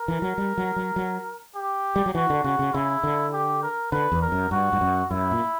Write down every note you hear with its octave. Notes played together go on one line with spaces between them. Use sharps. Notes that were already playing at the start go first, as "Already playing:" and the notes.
Already playing: A#4
E3
F#3
G3
F#3
F#3
F#3
G4
G3
F#3
E3 F#4
D3
C#3 F#4
C#3
C#3 E4
D3
G4
A#4
D3 B4
E2
A#4
F#2
G2 F#4
G2
F#2
F#2 E4
A#2